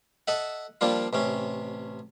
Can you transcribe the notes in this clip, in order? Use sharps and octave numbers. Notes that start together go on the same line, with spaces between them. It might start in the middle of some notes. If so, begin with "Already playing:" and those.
A4 D#5 E5 F#5
F3 G3 A#3 D4 F4
A1 C3 C#4